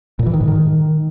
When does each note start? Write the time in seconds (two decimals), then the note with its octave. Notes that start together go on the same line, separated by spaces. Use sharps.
0.19 A#2
0.26 E3
0.34 D#3
0.41 G#2
0.48 D#3